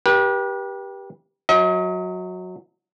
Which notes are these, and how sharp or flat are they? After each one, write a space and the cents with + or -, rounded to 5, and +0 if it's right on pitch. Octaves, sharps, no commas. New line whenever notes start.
G4 +0 B4 -40
F#3 -15 D#5 +45